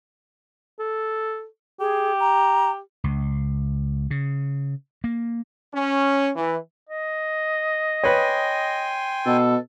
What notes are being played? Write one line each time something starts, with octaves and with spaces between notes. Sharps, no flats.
A4
G4 G#4
A#5
C#2
C#3
A#3
C#4
E3
D#5
B4 C#5 G5 G#5 C6
B2 A4